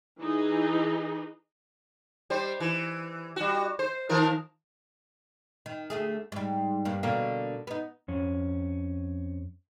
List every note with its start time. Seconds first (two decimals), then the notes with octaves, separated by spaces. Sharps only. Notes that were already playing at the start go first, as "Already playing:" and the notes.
0.19 E3 D#4 G#4
2.30 G3 C5
2.60 E3
3.36 G3 F#4
3.79 C5
4.09 D#3 F3 A#4
5.66 D#3
5.90 D2 A3 G#4
6.32 G#2 G3
6.85 G2 A#3
7.03 B2 D3 A#3
7.67 B3 D#4
8.08 F2 C#4